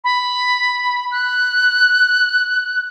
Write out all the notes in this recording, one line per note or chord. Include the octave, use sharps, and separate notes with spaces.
B5
F#6